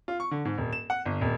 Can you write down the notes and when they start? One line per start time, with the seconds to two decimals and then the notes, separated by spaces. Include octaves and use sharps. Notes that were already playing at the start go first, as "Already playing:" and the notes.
0.08 F4
0.20 C#6
0.31 D3
0.45 G#2
0.58 D#1
0.73 E7
0.90 F#5
1.05 G1
1.21 D#1